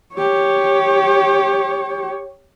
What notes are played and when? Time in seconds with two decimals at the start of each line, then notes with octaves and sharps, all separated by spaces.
0.15 G4 C#5